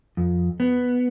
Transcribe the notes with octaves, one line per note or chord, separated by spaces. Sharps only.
F2
B3